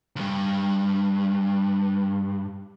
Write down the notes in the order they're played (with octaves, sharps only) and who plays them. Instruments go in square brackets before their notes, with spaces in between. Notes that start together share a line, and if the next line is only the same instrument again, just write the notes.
[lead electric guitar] C#2 G2